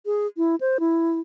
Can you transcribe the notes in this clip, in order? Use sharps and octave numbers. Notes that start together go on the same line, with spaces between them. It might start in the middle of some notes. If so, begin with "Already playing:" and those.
G#4
E4
C5
E4